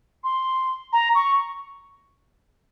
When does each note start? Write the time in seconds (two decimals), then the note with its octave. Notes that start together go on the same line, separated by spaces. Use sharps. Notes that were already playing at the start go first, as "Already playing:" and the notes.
0.24 C6
0.93 A#5
1.15 C#6